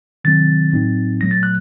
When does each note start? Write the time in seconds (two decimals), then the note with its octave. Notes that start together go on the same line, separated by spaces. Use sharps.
0.24 C3 D#3 F#3 C4 A6
0.73 A2 F#3 C4 D#4
1.21 A#2 F#3 A3 A#6
1.31 A6
1.43 F#6